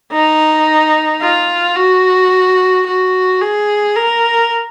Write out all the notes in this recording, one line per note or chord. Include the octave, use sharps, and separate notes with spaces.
D#4
F4
F#4
F#4
G#4
A#4